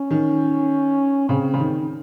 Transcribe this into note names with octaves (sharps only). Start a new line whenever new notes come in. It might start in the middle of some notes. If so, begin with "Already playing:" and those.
Already playing: C#4
D#3
C#3 C4
C#3
D#3